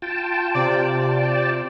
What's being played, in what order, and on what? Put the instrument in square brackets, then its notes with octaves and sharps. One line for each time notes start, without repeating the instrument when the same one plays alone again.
[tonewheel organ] F4 G5 A5
[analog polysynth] C3 [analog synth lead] D5